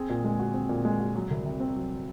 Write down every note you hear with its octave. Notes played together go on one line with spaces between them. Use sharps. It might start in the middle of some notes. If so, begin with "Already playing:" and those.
Already playing: C4 G#4
A#2
G#3
F#4
C4
A#2
G#3
F#4
F#3
C2
C3
C4
F#3